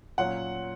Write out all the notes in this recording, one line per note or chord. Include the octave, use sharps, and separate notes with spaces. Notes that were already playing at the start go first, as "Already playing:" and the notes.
A#2 F#3 C#4 F#5